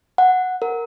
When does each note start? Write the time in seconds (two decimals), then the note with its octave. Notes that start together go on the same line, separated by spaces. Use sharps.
0.18 F#5
0.62 A#4